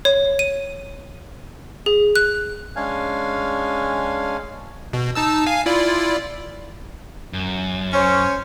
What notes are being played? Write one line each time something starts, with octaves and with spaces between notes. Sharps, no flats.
C#5
D#7
G#4
F#6
G#3 C#4 D4 F5 G#5
B2
D#4 A5 E6
F5 G#5
E4 F4 D5
F#2
C#4 C5 C#5